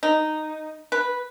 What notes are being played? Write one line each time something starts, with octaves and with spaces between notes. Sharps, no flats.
D#4
B4